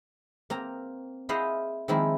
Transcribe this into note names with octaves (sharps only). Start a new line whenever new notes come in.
A#3 C4 A#5
E4 G#4 C5 D#5 F5 F#5
D#3 F3 G#3 A#3 C4 E4